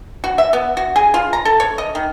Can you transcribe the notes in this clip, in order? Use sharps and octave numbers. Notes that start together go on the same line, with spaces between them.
F#4
E5
B3
F#4
G#4
F4
A#5
A4
C#5
D#5
D#3